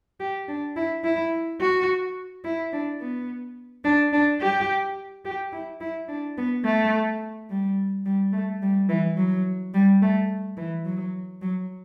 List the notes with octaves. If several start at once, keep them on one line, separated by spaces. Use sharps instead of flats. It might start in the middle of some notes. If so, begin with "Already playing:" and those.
G4
D4
E4
E4
F#4
E4
D4
B3
D4
D4
G4
G4
E4
E4
D4
B3
A3
G3
G3
A3
G3
E3
F#3
G3
A3
E3
F#3
F#3